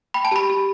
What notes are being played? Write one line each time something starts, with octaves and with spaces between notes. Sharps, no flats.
G5 B5
A5
G4 B5
G4